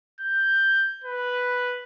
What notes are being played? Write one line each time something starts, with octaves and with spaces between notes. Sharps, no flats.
G6
B4